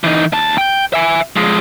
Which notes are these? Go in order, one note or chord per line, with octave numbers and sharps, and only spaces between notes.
E3 D#4
D#2 A5
G5
E5 G#5
F3 G#3